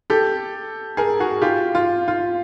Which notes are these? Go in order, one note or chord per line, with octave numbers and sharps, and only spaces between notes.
G4 A4
G#4 A#4
F#4 G#4
F4 G4
F4
F4